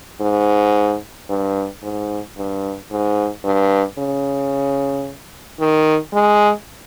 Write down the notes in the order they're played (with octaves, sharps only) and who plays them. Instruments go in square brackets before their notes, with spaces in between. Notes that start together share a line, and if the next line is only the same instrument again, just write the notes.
[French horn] G#2
G2
G#2
G2
G#2
G2
C#3
D#3
G#3